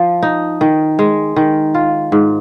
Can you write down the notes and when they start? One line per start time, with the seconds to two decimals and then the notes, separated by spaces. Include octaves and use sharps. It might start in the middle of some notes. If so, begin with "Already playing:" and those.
Already playing: F3
0.22 D#4
0.61 D#3
0.99 G#3
1.36 D#3
1.74 F4
2.12 G#2